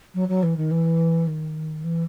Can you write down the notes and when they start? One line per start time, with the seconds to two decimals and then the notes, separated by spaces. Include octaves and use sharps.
0.14 F#3
0.28 F#3
0.43 E3
0.57 D#3
0.71 E3
1.27 D#3
1.84 E3